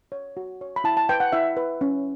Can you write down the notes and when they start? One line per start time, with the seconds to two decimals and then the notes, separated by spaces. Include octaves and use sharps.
0.12 C#5
0.37 F#4
0.61 C#5
0.76 B5
0.84 E4 A5
0.97 A5
1.09 B4 G5
1.20 F#5
1.32 E4 E5
1.57 B4
1.81 C#4